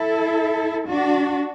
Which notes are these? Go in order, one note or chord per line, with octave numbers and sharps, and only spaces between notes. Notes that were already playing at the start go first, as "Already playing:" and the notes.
Already playing: E4 A4
D4 F#4